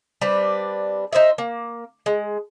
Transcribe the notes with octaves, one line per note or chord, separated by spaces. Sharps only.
G3 C4 D4 B4
D#4 C5 D#5 E5
A#3
G#3